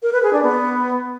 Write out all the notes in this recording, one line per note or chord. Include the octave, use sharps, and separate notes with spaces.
A#4
B4
G#4
D4
B3